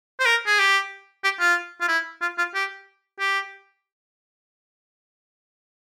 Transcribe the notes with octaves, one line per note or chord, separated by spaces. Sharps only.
C5
A#4
G#4
G4
G4
F4
F4
E4
F4
F4
G4
G4